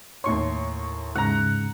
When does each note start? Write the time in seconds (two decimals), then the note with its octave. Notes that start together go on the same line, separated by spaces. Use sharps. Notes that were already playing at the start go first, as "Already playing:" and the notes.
0.24 D#2 A2 C#5 C6 C#6
1.15 G#2 C#3 F#5 A#5